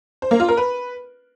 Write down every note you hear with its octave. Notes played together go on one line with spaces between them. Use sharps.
C5
A#3
F4
A#4
B4